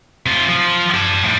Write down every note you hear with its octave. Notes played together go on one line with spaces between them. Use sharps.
C3 F4
F3
G4 A5
A2 G3